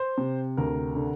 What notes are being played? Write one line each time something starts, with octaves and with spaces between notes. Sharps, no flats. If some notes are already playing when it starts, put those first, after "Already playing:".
Already playing: C5
C3
D2 A#4
D3